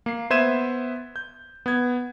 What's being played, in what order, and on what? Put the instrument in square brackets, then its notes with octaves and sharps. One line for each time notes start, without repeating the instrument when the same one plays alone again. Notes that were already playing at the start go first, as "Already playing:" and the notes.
[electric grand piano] A#3 C7
B3 C5 E5 G#6 D#7 E7
G6
B3 G#6